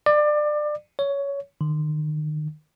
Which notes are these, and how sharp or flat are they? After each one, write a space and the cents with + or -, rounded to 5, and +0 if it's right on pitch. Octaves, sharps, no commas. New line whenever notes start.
D5 +25
C#5 +15
D#3 -35